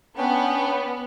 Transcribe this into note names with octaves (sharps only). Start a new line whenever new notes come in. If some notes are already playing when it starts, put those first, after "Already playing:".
B3 C#4 D4 G5